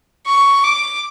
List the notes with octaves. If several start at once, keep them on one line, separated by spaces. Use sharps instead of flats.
C#6
D6